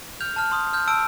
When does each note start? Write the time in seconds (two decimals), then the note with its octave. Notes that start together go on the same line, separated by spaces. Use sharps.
0.20 F6 G6 F7
0.36 A5 F6
0.52 C6 D#6
0.73 F6 G6
0.87 A5 E6 D7